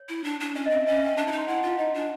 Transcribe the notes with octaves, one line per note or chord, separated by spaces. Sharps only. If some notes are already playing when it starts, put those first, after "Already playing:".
Already playing: C#5
E4
D4
D4
C#4 D5
D#5
C4 E5
C#4 D#5
E5
G5
D4 A5
E4 A#5
D#4
C6
E4 F#5
F#5
F4 F5
D#4 D#5
D4 G#5